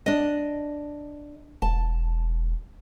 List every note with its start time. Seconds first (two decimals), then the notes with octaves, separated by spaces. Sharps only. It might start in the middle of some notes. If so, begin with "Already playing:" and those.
0.06 D4 D#5
1.62 E1 A5